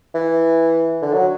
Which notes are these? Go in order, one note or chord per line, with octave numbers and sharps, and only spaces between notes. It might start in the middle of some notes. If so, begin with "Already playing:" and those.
E3
D3
F#3